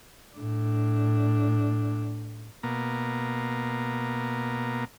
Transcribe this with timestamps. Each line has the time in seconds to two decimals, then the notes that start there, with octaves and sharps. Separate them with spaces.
0.35 A2 D4
2.63 B2 A#3